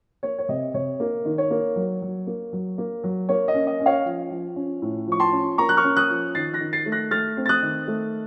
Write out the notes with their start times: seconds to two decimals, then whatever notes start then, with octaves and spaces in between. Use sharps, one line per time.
0.23 A#3 C#5
0.38 C#5
0.49 C3 D#5
0.74 C3 C#5
1.00 A#3
1.25 D#3
1.38 C#5
1.51 A#3
1.76 F#3
2.02 F#3
2.27 A#3
2.53 F#3
2.78 A#3
3.04 F#3
3.29 A#3 C#5
3.48 D#5
3.54 C#4
3.67 D#5
3.80 C#4
3.86 C#5 F5
4.05 F3
4.31 F3
4.56 C#4
4.82 A2
5.07 F3 C#6
5.20 A5 C6
5.32 C#4
5.58 A#3 A#5 C#6
5.69 F#6
5.77 C#6 F6
5.84 C#4
5.97 D#6 F#6
6.09 F3
6.35 D#3 A6 C7
6.53 F#6 A#6
6.60 D#3
6.73 A6 C7
6.86 A3
6.92 F#6 A#6
7.11 A3 F6 A6
7.37 C4
7.46 A6
7.49 D#6 F#6
7.62 D#3
7.88 A3